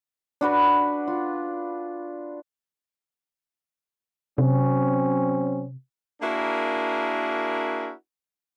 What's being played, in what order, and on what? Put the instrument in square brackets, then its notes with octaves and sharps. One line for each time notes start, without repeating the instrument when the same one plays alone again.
[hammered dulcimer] D4 F#4 B4
F4
[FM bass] C3 [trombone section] F#3 C4 C#4
[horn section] A#3 D4 E4 F#4 G#4 A#4